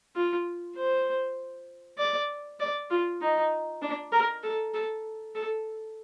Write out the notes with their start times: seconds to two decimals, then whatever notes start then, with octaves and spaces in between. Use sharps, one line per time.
0.16 F4
0.76 C5
1.98 D5
2.60 D5
2.90 F4
3.21 D#4
3.82 D4
4.12 A#4
4.43 A4
4.74 A4
5.35 A4